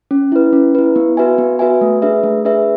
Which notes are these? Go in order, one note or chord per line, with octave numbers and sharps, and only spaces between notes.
C#4
E4 B4
C#4
E4 B4
B3
F#4 B4 E5 G#5
B3
F#4 B4 E5 G#5
A3
D4 G#4 B4 E5
A3
D4 G#4 B4 E5